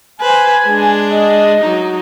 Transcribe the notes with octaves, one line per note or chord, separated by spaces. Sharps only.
B4 C5 G#5
G#3 D4
D#5
F#3 D#4